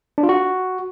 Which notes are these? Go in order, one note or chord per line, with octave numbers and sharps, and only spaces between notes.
D4
F4
F#4